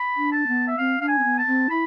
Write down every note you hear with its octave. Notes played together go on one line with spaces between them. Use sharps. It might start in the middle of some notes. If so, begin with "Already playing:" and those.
Already playing: B5
D4
A5
B3
E5
C4 F5
D4 F5
G#5
C4
B3
A5
C4
E4 B5